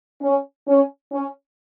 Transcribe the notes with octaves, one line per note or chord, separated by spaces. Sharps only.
C#4
C#4
C#4